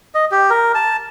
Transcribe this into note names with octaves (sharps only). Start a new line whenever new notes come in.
D#5
G4
A#4
A5